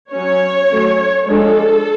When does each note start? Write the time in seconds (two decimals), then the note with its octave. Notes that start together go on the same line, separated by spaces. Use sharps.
0.12 F#3 C#4 C#5
0.70 F#3 A3 C#4
1.27 F3 G#3 D4 A4